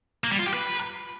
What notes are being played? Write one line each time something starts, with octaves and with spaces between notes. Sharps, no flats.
A#3
G3
F4
G4
B4